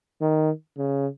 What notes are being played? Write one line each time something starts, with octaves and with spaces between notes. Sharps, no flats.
D#3
C#3